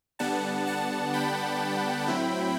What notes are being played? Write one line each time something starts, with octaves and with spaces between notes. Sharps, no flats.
D3 G3 B3 D4 F#5 A5
F#5 A5
G5 B5
A2 F#3 C4 E4